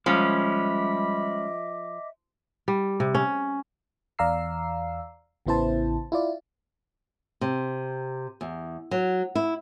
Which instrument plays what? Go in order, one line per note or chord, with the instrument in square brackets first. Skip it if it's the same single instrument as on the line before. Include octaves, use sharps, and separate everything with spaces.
[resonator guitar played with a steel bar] F3 [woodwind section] G3 B5 [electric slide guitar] G#3 C#4 [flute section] D#5 E5 D6
[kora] G3
C3
C#4
[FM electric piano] E2 D5 F5 A#5 E6 C7
A1 C#3 B3 E4 C5 A5
E4 F4 D5
[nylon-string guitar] C3
E2
F#3
E4